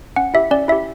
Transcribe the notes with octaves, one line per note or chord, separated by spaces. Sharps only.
C#4 F#5
E4 G4 E5
C#4 D5
E4 G4 E5